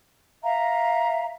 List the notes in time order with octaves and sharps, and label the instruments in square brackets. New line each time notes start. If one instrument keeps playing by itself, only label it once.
[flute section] E5 F5 A#5